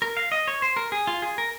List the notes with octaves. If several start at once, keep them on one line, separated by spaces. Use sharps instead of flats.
A#4
F5
D#5
C#5
C5
A#4
G#4
F4
G#4
A#4